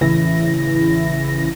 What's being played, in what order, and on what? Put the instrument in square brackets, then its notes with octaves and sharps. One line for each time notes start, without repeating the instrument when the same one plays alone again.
[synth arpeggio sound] A1 C#3 E3 E4 A#6